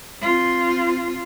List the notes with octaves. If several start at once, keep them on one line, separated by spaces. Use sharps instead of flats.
C4 F4